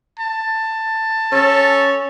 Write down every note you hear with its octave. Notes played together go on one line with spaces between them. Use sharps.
A5
C#4 A4